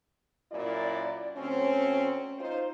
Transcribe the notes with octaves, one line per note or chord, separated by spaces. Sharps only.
F#2 A#2 E4 D5
D2 C4 C#4
D#4 F4 C5